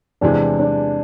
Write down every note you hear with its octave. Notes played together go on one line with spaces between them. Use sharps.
E2 C3 E3 G#3 D4
D4